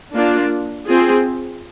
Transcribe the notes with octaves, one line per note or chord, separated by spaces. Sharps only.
A#3 D4 F4
C4 F4 G#4